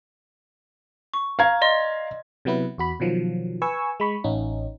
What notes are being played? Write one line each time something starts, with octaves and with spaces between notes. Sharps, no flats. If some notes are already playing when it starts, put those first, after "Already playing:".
C#6
F5 A#5 G#6
D5 D#5 C6
C3 F#3 B3 E4 B4
E2 F#4 B5
B2 D#3 F3 F#3
B4 G#5 C#6 E6
G#3 B5 C#6
A1 C#4 D#4